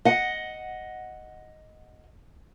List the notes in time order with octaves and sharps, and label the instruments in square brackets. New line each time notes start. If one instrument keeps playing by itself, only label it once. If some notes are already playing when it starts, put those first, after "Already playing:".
[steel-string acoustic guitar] D#5 F#5